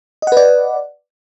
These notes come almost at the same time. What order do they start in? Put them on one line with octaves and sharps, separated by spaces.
D#5 F#5 B4 D5